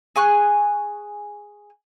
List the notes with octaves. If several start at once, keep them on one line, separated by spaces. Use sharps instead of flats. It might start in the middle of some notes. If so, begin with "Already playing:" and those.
G#4 G#5 C#6 F#6